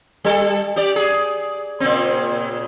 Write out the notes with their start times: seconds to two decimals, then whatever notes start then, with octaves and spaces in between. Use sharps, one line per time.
0.24 G3 A4
0.76 G4 D5
0.96 G#4
1.80 A#2 C#3 C4